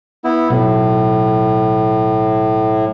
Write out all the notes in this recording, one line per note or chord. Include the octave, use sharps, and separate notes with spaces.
B3 E4
B1 A2